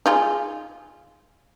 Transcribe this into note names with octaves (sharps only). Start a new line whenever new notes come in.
D#4 F4 G#4